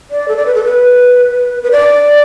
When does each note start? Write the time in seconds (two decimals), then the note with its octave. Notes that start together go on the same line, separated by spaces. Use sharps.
0.11 D5
0.28 A4
0.37 D5
0.46 B4
0.55 A4
0.64 B4
1.63 B4
1.71 D5